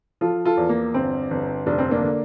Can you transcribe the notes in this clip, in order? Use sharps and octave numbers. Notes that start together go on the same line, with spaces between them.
F3 F4 A4
F4 A4
E2
A#3
G1 C4
G1
F1 D4
C4
A#3 D4
D3